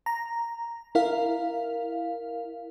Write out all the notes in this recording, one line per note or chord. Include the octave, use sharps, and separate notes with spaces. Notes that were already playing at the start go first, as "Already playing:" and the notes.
A#5
E4 A#4 F5